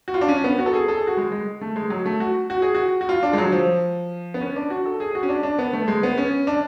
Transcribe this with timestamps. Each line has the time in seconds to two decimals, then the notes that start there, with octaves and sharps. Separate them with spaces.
0.08 F#4
0.14 F4
0.21 D4
0.28 C#4
0.44 B3
0.59 F#4
0.66 A4
0.74 G#4
0.88 A4
0.97 G#4
1.07 F#4
1.17 G#3
1.32 G#3
1.61 A3
1.76 G#3
1.90 F#3
2.06 A3
2.20 F#4
2.50 F#4
2.62 G#4
2.75 F#4
3.01 F#4
3.09 F4
3.23 D4
3.33 G#3
3.38 F#3
3.52 F3
4.34 B3
4.41 C#4
4.56 D4
4.70 F#4
4.86 A4
5.00 G#4
5.11 G#4
5.15 F#4
5.23 C#4
5.29 D4
5.43 D4
5.59 B3
5.73 A3
5.88 G#3
6.03 B3
6.18 C#4
6.47 D4